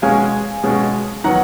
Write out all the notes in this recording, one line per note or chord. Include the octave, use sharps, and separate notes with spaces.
B2 G#3 C#4 F5 G#5
B2 G#3 C#4
D#3 F#3 B3 F#5 A#5